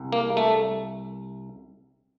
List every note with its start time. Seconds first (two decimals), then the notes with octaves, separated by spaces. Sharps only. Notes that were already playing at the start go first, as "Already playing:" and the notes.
Already playing: C2
0.12 A#3
0.37 A3